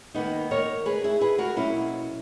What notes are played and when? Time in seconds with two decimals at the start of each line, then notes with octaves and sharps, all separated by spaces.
0.14 D#2 D#3 A#3 B3 D#4
0.51 A#4 C#5
0.86 G#4 B4
1.04 E4 G#4
1.21 G#4 B4
1.38 F#4 A#4
1.57 B2 F#3 A#3 C#4 E4